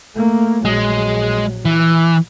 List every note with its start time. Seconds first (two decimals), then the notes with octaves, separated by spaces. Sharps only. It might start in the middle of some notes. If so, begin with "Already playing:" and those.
0.15 A3 A#3
0.65 A#1 F#3 G#3
1.65 E3